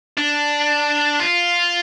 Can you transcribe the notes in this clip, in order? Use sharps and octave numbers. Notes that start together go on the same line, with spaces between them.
D4
F4